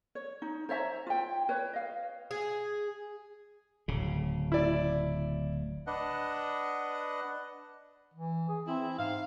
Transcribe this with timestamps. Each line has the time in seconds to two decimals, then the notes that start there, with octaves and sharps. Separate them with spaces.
0.15 C#5
0.42 D#4
0.69 C5 C#5 E5 A#5
1.07 F4 G5
1.49 B4 C#5
1.73 D#5 F5
2.31 G#4
3.88 D1 C#3
4.52 E4 D5
5.87 D4 B4 D#5 F#5
8.14 E3
8.49 G#4
8.66 E2 C4 E4
8.99 G#2 F5